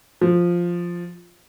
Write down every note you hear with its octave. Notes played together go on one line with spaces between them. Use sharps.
F3